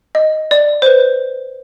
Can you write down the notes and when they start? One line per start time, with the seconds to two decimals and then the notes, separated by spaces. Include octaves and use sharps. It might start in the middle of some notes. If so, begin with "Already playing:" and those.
0.15 D#5
0.51 D5
0.82 C5
0.86 B4